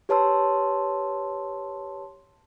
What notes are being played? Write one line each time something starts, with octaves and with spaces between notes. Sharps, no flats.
G4 B4 C#5 A5 C6 E6